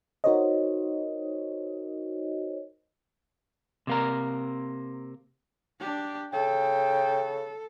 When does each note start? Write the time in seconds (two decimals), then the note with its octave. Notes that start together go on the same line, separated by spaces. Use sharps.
0.24 D#4 F#4 A#4 C5 C#5 D#5
3.87 C3 A#3 A#4
5.80 D4 G4
6.33 C#3 A4 G5